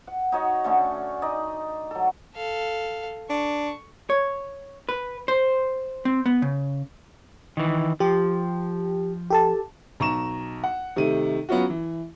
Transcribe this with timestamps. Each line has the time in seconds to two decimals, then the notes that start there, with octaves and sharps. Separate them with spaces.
0.07 F#5
0.32 D#4 F#4 C#5 D#5
0.64 D3 A3 C#4
1.22 D#4 D5 D#5
1.91 F#3 A4
2.35 A4 F5
3.30 D4 C#6
4.10 C#5
4.89 B4
5.28 C5
6.05 C4
6.26 B3
6.42 C#3
7.57 D#3 E3
8.00 F3 G4
9.30 G4 A4 A5
10.00 B1 A#5 C#6 E7
10.64 F#5
10.96 C3 D#3 A3 D#7
11.49 F#3 B3 C#4 F4 F#4
11.70 E3